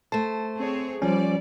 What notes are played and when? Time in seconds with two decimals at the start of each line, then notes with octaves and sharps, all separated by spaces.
0.12 A3 C5 A5
0.57 C4 G#4 C#5
1.02 F3 G3 C#4 D5